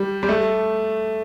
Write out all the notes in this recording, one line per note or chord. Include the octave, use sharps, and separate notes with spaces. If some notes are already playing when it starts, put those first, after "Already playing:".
Already playing: G3
G3
A3